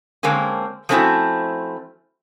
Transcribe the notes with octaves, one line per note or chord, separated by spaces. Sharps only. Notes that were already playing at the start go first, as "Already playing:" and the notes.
D3 G#3 A#3 C4 C#4
F3 A3 C4 C#4 E4 F#4